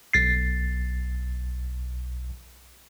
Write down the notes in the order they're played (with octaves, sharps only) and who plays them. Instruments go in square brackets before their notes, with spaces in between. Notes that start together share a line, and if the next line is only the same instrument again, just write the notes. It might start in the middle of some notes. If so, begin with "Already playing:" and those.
[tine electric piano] B1 A6 C7